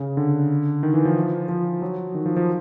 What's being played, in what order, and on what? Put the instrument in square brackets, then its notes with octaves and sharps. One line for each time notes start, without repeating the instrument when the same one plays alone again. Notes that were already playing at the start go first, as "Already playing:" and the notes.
Already playing: [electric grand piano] C#3
D3
D#3
E3
F3
F3
F#3
D#3
F3
F3